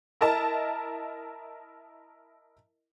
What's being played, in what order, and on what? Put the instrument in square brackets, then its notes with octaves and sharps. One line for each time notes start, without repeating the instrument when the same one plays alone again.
[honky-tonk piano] E4 A#4 D#5 A5